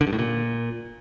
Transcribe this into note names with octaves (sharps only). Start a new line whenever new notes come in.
D3
G2
A2
A#2